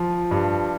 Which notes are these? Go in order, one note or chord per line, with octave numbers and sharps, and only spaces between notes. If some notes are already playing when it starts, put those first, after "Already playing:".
Already playing: F3
G2